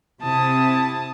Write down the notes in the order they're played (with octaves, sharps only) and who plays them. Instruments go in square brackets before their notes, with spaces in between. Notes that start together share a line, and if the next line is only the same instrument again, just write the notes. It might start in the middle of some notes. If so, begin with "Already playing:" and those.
[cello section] C3 E4 [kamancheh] A5 D#6